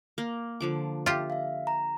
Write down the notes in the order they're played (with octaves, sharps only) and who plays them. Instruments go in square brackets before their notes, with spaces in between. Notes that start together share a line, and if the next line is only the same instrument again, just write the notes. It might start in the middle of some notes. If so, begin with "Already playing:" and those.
[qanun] A#3
D3 F3 D6
[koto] F4 G4 [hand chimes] E5
[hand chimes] E5 F5
A#5